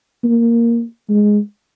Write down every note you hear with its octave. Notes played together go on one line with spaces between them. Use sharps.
A#3
G#3